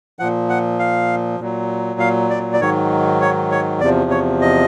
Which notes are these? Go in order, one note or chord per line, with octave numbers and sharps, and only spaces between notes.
A#2 F3 F#5
F#5
F5
A#2 F#3
F5
D5
D5
G#2 D#3 F#3 C#5
C#5
C#5
E2 C3 F3 D5
C#5
D#5